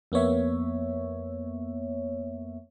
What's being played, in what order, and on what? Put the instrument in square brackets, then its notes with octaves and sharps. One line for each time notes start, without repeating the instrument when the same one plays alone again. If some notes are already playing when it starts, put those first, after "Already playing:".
[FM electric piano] F2 A#3 B3 C#5 E5